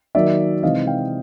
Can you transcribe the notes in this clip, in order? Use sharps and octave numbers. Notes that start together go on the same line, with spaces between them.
D#3 F#3 A#3 D#4 D5 E5
C3 E3 G#3 C4 D#4 D#5 F5
F5 G5